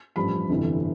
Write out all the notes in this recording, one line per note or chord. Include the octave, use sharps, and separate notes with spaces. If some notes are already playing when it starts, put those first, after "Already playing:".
A1 G2 F3 B5
G1 F2 C3 E3